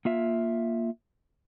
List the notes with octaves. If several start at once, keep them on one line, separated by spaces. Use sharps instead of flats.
A#3 F4 E5